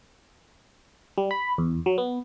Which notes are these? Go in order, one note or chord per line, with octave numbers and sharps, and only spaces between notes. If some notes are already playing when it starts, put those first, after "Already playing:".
G3
B5
E2
F#3
B3